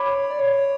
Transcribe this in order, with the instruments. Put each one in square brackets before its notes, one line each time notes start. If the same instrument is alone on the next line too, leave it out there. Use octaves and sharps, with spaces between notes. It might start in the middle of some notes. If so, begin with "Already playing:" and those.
Already playing: [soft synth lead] C#5 [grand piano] B5 D6
[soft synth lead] D5
C#5